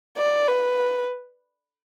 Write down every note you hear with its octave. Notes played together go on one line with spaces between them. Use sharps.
D5
B4